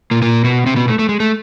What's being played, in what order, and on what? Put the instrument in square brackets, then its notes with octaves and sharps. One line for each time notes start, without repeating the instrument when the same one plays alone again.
[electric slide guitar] A#2 A#3
A#2 A#3
B2 B3
C3 C4
B2 B3
A3
A3
G#3
A3